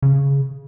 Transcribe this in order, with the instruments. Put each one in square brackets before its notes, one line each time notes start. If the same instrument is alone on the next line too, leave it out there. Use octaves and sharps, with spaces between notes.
[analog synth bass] C#3